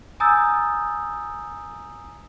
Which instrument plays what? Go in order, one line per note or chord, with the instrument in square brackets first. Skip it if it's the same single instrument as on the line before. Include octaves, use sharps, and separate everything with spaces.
[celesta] G#5 A#5 D#6 E6 G6 A6